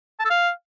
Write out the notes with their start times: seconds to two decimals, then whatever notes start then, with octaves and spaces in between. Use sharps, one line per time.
0.20 A5
0.25 A4
0.30 F5